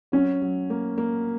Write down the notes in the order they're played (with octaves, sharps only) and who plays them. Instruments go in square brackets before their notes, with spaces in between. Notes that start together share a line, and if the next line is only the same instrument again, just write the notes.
[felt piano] F#3 [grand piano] C#4
[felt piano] F#3
A#3
A#3